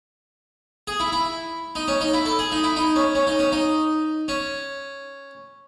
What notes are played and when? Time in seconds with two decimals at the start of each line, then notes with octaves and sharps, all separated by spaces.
0.87 G#4
1.00 E4
1.12 E4
1.75 D#4
1.88 C#4
2.01 D#4
2.13 E4
2.26 A4
2.39 G#4
2.52 D#4
2.64 E4
2.76 D#4
2.96 C#4
3.15 C#4
3.27 D#4
3.39 C#4
3.52 D#4
4.28 C#4